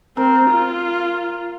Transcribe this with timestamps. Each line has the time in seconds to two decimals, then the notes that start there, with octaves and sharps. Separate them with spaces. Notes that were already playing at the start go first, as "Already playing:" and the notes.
0.17 C4 A#4
0.50 F4